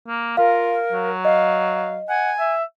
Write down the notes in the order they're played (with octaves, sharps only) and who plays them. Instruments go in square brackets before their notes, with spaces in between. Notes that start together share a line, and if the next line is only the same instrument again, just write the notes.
[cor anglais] A#3
[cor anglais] F4 [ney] A#4 [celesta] F5
[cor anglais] F#3
[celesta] D#5 [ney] F5
[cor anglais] F#5 [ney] G#5
[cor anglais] E5